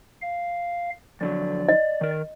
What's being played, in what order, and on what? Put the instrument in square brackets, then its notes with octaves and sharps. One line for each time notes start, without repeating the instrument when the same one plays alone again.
[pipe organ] F5
[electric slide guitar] F2 D3 F#3 [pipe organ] D5
[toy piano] D#5
[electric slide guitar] D#3 A#4